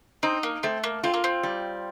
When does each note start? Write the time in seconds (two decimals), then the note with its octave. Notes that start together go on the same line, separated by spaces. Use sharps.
0.23 C4 D#4
0.43 A#3
0.63 A3 C4
0.84 A#3
1.03 C4 F4
1.14 A#3
1.24 C4
1.43 G3